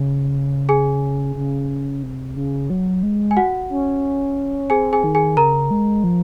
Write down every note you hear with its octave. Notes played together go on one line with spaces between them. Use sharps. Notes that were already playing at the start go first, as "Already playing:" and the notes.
Already playing: C#3
G#4 G#5
C#3
C3
C#3
F#3
G#3
G#5
F#4 F#5
C#4
C4 G#4 G#5
G#4 G#5
D#3
G#4 G#5
C#3 A#4 A#5
G#3
F3